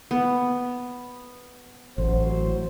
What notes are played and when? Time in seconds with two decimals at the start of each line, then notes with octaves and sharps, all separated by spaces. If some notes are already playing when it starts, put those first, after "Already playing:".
0.11 B3
1.98 A1 F#3 C5